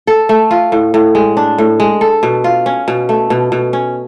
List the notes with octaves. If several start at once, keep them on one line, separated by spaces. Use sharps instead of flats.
A4
A3
F4
A2
A2
G#3
D4
A2
G#3
A4
B2
F4
C#4
B2
A3
B2
B2
C#4